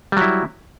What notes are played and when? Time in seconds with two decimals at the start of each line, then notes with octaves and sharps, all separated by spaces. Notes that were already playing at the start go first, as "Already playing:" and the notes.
0.12 G3
0.17 F#3
0.21 E4